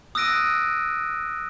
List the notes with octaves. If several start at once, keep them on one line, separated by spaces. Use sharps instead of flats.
D#6 E6 F#6 A#6 D7 D#7